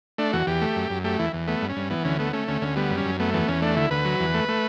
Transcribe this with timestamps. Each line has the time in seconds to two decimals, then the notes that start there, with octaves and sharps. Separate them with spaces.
0.18 A3 D4
0.33 E2 F#4
0.47 E2 G4
0.62 A3
0.76 F#2
0.90 F#2
1.04 A3 G4
1.19 E2 E4
1.33 E2
1.47 A3 B3
1.61 G2
1.69 C#4
1.76 G2
1.90 E3 B3
2.05 D2 C#4
2.19 A3 B3
2.33 A3 C#4
2.47 D2 C#4
2.62 D2 C#4
2.76 G3 B3
2.91 F#2
2.97 C#4
3.05 F#2
3.20 A3 B3
3.33 E2 B3
3.48 E2 C#4
3.62 A3 D4
3.77 D2 E4
3.91 D2 B4
4.05 F#3
4.19 E2
4.34 A3
4.49 A3